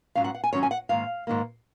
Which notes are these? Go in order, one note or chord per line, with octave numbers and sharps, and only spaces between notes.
G#2 D#3 F#3 C#4 F5
F#5
F#5
G#5
G#2 D#3 F#3 C#4 C#5
G#5
F#5
G#2 D#3 A#3 F5
G#2 D#3 A#3